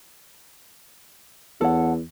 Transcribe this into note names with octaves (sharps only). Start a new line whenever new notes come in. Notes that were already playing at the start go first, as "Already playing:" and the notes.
E2 A4 C#5 F#5